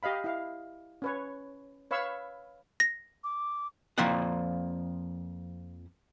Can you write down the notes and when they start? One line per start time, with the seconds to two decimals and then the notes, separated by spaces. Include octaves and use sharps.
0.03 G4 D#5 F5 B5
0.24 E4 F5
1.02 C#4 B4 C#5
1.91 B4 C#5 F5 B5 C#6 E6
2.80 A#6
3.24 D6
3.98 F2 F3 A#3 F#5